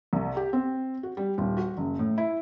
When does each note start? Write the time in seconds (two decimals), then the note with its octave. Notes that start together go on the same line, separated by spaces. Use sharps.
0.13 C2
0.37 G4
0.53 C4
1.03 F#4
1.17 G3
1.38 D#1
1.57 F#4
1.77 F#1
1.99 A2
2.18 E4